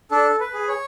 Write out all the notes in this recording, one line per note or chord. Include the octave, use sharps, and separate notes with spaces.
D4 A4
B4
G#4
C#5